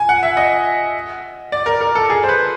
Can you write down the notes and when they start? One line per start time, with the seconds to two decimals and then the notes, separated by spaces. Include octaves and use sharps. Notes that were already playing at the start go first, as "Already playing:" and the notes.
Already playing: G#5
0.09 F#5
0.23 E5
0.37 D#5
1.52 D5
1.66 A#4
1.81 A#4
1.95 A4
2.10 G#4
2.24 C5
2.29 B4